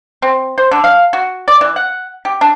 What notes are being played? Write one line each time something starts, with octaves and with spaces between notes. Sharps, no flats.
C4
C5
D3
F5
F#4
D5
E3
F#5
G4
D4